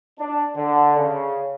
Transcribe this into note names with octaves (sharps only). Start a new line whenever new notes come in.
D4
D3
C#3